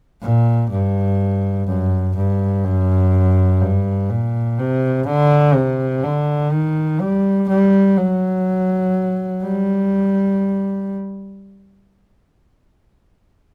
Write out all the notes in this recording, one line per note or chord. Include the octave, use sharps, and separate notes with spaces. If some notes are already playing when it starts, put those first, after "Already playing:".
A#2
G2
F#2
G2
F#2
G2
A#2
C3
D3
C3
D3
D#3
G3
G3
F#3
G3